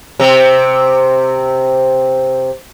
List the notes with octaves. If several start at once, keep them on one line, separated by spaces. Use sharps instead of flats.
C3 C4